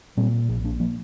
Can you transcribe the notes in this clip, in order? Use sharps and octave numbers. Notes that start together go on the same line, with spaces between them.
A#2 G3 C4
A#1 A#3 D4
A#3 D4
F3 A#3